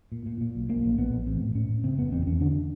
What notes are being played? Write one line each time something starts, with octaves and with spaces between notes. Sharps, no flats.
A#2
A#2
A#2
B1
A#1 A#3
A#1
A#1 B3
A#1
A1 C4
A2
A2 C#4
A2
C#3 C4
F#1 B3
E2 C4
E2 C#4
D3 D4